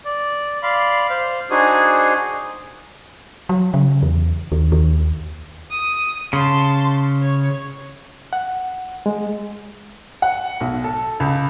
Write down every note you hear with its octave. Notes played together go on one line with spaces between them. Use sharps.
D5
D5 F5 B5 C6
C5 F5
D4 D#4 F#4 G#4 C5 G#5
F#3
C#3
E2
D#2
D#2
D#6
C#3 A5 C6
C#5
F#5
G#3
F#5
B1
A4
C#2